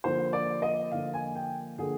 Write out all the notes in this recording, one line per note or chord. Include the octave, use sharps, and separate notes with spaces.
D3 F3 A#3 C5
D5
D#5
D3 F3 A#3 F5
G#5
G5
D3 F3 A#3 G#4